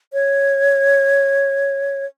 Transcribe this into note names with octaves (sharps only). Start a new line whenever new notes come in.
C#5